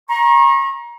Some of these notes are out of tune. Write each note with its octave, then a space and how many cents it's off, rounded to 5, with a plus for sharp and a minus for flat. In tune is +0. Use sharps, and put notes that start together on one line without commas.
A#5 +25 C#6 -35